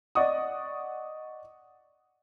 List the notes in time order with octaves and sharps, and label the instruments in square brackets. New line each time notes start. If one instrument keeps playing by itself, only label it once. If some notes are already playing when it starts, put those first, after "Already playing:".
[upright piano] D5 D#5 F#5 C#6 D#6